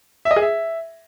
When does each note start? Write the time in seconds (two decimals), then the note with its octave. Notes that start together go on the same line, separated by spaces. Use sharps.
0.25 E5
0.31 D#5
0.36 G#4
0.42 E5